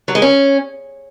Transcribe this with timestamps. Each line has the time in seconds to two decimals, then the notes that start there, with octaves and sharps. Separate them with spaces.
0.08 F#3
0.15 G#3
0.22 C#4